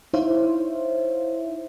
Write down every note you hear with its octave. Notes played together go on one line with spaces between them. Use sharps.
D#4 E4 C5 C#5 E5 F5